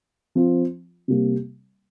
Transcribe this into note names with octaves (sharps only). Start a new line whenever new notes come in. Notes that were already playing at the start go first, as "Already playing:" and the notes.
F3 C4 F4
C3 G3 A#3